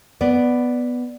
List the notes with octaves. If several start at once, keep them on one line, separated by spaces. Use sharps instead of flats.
B3 D5